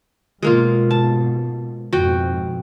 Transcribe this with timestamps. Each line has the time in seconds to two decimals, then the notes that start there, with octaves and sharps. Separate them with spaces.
0.43 G#2 B2 G#3 A#3 F4
0.91 A5
1.93 F2 G#2 B2 F#4 G5